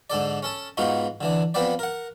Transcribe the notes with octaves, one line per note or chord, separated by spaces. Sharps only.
G#2 D3 A4 D5
C#4 A4 A5
G#2 B3 D#4 F4 F#4
D3 E3 D4
F3 B3 C4 B4 D5
A#4 F#5